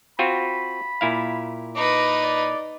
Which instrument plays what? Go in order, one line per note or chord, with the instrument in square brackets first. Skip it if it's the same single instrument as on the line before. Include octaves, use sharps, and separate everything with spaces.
[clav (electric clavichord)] C4 F4 F#4 [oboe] B5
[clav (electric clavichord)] A#2 E4 F5
[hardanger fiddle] D#4 B4 [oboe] D6
[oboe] D5